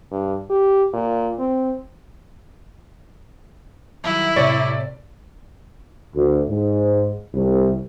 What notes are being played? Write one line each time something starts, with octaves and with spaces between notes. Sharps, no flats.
G2
G4
A#2
C4
D#3 F#3 G3 E4
A2 C3 C#5 D5
D2
G#2
C2